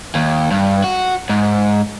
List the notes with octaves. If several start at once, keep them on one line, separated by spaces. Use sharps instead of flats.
D#2
G2
F#4
G#2